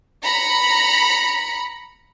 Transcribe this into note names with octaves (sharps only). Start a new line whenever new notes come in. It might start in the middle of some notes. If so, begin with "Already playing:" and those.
A#5 B5 C#7